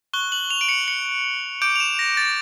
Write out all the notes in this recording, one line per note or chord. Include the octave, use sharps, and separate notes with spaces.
C#6 F#6 G7
F#7
F7
D7
C#7
C#7
D6 G6 D7
F7
E7
A#6
A6